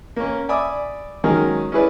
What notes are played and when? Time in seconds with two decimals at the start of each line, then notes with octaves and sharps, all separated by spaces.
0.16 A#3 C#4
0.49 D5 E5 G#5 B5 D6 D#6
1.24 D#3 F#3 G#3 C#4 G#4 A#4
1.72 C#4 E4 G#4 B4 D5